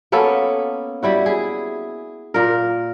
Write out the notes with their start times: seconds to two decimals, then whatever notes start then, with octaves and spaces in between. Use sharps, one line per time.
0.12 A#3 B3 C#4 A4
1.02 G3 E4 F#4
1.26 G#4
2.34 A#2 A#4